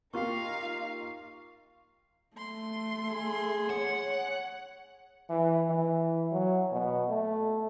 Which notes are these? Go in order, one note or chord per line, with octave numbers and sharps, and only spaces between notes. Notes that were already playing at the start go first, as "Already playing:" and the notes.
A#3 D#4 F4 G4 F5 C#6 C7
A3 C6
G#4
C#5 F#5
E3
E3
F#3
B2
A3